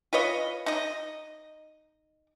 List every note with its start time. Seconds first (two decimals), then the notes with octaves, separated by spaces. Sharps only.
0.13 F4 B4 C#5 D#5
0.66 D#4 D#5